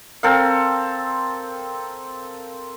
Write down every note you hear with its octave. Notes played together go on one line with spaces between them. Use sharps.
C4 A4 A#4 F5